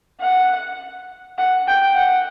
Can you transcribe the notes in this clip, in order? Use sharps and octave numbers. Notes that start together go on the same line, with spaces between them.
F#5
F#5
G5
F#5